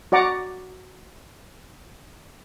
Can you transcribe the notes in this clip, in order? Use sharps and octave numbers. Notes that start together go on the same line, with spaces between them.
F#4 D5 F#5 A#5 D6